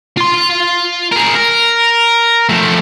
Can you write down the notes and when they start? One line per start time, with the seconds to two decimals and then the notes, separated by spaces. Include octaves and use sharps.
0.17 F4 C6
1.12 G#4 A#4
1.35 A#4
2.49 F3 A3